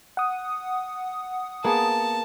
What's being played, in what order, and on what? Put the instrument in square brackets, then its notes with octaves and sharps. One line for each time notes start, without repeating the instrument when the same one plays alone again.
[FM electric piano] F#5 D#6
[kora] A#3 B3 G#4 [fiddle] A5